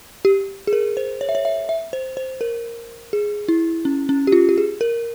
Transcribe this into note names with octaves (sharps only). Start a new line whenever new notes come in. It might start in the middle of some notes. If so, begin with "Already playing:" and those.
G4
G#4
A#4
C5
C#5
E5
C#5
E5
E5
C5
C5
A#4
G#4
E4
C#4
C#4
G4
F4
G4
G#4
A#4